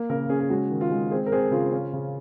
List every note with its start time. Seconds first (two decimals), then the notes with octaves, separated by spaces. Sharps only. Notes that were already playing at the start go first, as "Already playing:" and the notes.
Already playing: A#3
0.10 C#3 A#4
0.29 C#4 G#4
0.40 G#4
0.50 G#3 F#4
0.70 D#3
0.81 F4
0.91 G#3
1.11 C4 G#4
1.26 A#4
1.32 C4 G#4
1.51 C#3 F4
1.72 C#4
1.93 C#3